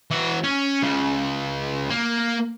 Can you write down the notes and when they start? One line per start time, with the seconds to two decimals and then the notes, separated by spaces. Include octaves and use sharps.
0.11 E3 F#4
0.44 C#4
0.83 C#2 C#3
1.90 A#3